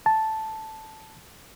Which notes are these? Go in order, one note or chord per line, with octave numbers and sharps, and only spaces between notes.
A5